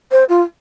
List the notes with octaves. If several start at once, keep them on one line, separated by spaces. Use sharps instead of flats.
C5
F4